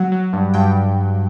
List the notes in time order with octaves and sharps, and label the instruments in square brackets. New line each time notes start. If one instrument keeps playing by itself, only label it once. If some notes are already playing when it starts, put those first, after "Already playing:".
Already playing: [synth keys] F#3 F#5
F#3
G2
G2 G5